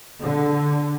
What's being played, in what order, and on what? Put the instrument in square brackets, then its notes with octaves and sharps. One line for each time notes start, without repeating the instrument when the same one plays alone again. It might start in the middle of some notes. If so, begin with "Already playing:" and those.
[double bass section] D3